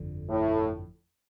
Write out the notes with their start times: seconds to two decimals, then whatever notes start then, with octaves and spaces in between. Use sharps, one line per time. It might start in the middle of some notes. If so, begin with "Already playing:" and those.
Already playing: G1 F2 D3
0.30 A2